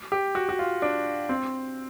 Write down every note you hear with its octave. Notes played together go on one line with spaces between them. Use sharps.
G4
F#4
F#4
F4
D4
C4